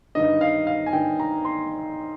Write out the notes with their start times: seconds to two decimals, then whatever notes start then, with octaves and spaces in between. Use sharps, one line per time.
0.15 G2 D#3 D#5
0.41 F5
0.67 F5
0.86 G#5
0.93 G2 D#3 G5
1.20 A#5
1.45 C6